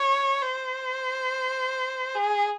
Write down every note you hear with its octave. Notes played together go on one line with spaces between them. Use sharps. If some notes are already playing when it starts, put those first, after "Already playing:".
Already playing: C#5
C5
G#4